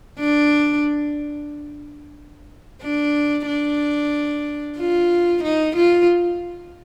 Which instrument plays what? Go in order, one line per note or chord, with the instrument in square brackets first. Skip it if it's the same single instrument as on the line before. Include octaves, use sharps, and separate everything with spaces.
[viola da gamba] D4
D4
D4
F4
D#4
F4